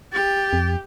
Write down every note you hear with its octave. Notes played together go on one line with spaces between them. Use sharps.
G4 A6
F2